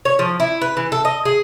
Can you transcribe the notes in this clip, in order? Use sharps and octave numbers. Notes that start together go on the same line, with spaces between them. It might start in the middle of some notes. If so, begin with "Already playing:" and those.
C#5
F3
E4
B4
E3
A4
D#5
G#4